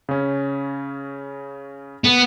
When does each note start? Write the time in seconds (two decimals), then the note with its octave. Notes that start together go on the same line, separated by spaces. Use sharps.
0.09 C#3 C#4
2.04 B3